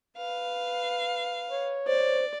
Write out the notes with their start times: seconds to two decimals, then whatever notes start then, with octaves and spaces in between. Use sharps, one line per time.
0.18 B4 F5
1.50 C#5
1.87 C5 D5